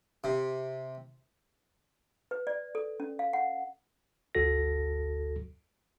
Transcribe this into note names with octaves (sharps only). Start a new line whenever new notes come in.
C3
B4
D5
A4
C#4
F5
F#5
G1 D2 F#4 A4 A#6